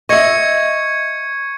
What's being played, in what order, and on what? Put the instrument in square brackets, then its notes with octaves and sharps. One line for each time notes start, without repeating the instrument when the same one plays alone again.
[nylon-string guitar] D#5 E5 [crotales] C#6 G#6 C#7